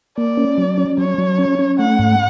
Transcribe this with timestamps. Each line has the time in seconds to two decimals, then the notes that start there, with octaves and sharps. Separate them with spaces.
0.17 A#3 D5
0.37 C#4
0.58 F#3
0.78 C#4
0.98 F#3 C#5
1.18 F#3
1.39 C#4
1.59 C#4
1.79 A3 F#5
1.99 G#2